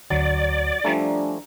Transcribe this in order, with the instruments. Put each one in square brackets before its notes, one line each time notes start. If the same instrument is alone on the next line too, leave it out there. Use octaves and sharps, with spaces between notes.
[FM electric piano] D2 D3 [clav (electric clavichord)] F#3 [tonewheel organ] D5
[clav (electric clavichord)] F3 G3 A3 [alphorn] D4 [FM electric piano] G#5 A#5